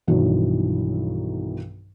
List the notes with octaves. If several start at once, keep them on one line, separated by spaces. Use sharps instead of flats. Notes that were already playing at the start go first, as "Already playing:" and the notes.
B1 G2 D#3 E3 F#3